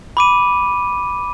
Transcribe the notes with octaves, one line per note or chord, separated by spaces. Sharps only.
B5 D6 D#7